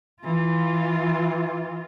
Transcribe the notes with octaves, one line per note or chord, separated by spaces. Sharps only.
E3 F4